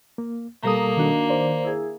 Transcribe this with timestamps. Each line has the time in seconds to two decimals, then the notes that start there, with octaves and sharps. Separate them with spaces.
0.18 A#3
0.63 B2 G3 A#3 A4 A#5 D#6
0.97 D#3 D4 F#4
1.29 C5 D5
1.64 E4 G#4